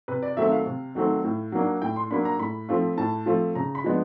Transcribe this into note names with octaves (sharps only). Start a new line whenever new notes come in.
C3 B4
D5
D#3 F#3 A3 C4 E5
F5
C3
D#3 F#3 A3 C4
A2
F#3 A#3 D4
A2 G5
C6
F#3 A#3 D4 B5
A#5
A2 B5
F3 A3 C4 F4
A2 A5
F3 A3 C4 F4
C#3 A#5
B5
F3 G#3 B3 D4